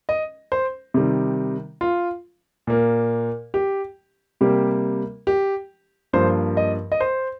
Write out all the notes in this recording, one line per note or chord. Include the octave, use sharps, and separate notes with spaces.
D#5
C5
C3 D#3 G3
F4
A#2 A#3
G4
C3 G3 A#3 G4
G4
G2 F3 A#3 C5
D#5
D#5
C5